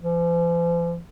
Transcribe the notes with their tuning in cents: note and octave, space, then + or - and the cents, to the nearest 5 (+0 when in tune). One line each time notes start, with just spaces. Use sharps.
F3 -45